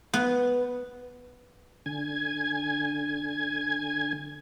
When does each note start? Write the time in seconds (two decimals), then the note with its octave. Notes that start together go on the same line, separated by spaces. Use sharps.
0.14 B3
1.86 D3 G#5 G#6